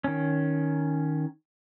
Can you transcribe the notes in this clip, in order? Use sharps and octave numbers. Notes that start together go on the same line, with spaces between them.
D#3 C#4